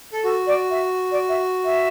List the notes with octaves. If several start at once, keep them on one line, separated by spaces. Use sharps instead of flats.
A4
F#4 A4
D5
E5
D5
E5
E5